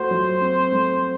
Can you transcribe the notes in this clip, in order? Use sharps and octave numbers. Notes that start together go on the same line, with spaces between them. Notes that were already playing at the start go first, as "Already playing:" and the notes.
Already playing: A3 F#4 C5
F#3
C4
A3